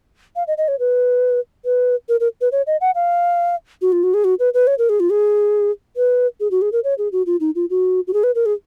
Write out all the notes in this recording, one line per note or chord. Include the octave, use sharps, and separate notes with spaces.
F5
D#5
D#5
C#5
B4
B4
A#4
A#4
B4
C#5
D#5
F#5
F5
F#4
F4
F#4
G#4
F#4
B4
B4
C#5
A#4
G#4
F4
G#4
B4
G#4
F#4
G#4
A#4
C#5
G#4
F#4
F4
D#4
F4
F#4
F#4
G#4
B4
A#4
G#4